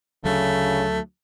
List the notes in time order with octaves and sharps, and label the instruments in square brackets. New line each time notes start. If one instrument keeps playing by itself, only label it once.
[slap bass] D2 F#3 [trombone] C#3 [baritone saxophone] A3